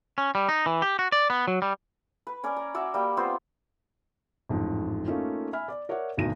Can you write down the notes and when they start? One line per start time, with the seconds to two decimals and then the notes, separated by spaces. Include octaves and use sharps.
0.18 C#4
0.35 G3
0.49 D#4
0.66 E3
0.82 G4
0.99 F#4
1.12 D5
1.30 B3
1.48 F#3
1.62 G3
2.27 B4
2.43 C#4 A#4 D5
2.56 A#5
2.74 F#4 D5 E5
2.94 G3 A#3 G5
3.17 B3 C4 F4 C5
4.49 A1 F2 G#2
5.06 A3 A#3 C#4 D#4 F4
5.53 E5 G#5 B5 F6
5.68 D5
5.89 A#4 C#5 D5 E5 F#5
6.17 G#1 D2 B2 D#4 A#6 D#7